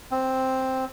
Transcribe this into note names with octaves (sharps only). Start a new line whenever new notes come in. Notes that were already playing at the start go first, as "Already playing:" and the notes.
C4